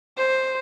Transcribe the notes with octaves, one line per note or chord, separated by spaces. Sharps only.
C5